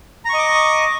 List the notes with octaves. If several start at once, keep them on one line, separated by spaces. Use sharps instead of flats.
D#5 A#5 C#6 D6